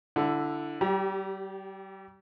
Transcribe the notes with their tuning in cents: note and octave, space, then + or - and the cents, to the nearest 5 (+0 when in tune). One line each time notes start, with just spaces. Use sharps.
D3 +0 E4 +15
G3 -35 G4 +0 A#5 +40